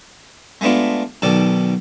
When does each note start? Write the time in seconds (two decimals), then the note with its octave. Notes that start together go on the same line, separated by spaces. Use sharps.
0.61 G#3 A3 B3 D4 F4
1.22 B1 B2 D#3 A4 D5